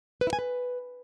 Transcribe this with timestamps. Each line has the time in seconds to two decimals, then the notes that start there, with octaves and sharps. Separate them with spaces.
0.21 B4
0.27 E4
0.33 G#5
0.39 B4